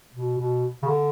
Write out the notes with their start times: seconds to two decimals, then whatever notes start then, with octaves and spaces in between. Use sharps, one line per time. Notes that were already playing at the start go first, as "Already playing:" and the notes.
0.14 B2
0.39 B2
0.83 C#3
0.87 D3